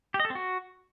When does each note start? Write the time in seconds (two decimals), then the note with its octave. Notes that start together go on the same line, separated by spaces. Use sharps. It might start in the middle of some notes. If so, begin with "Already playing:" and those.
0.14 G4
0.20 D#5
0.25 A4
0.30 C4
0.35 F#4